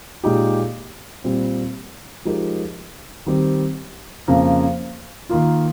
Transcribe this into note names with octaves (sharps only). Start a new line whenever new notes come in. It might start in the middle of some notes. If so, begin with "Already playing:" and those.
A#2 G#3 D#4 G4
A#2 G3 C4
F3 G#3 D#4 G4 A#4
D#3 G3 C4 G4
F2 C#3 F3 A#3
D#3 A#3 F4